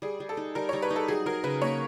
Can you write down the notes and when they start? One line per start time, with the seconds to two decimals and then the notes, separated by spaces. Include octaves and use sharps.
0.02 G3 G#4
0.20 G3
0.29 A4
0.37 D#4
0.55 G3 A#4
0.69 G3 C#5
0.82 B4
0.90 D#4
0.96 A4
1.08 F#3 G#4
1.26 F#3 A#4
1.44 C#3 B4
1.61 A#3 C#5